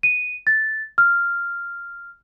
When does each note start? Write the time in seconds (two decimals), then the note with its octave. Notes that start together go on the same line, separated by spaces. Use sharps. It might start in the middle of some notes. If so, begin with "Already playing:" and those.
0.03 D#7
0.47 A6
0.98 F6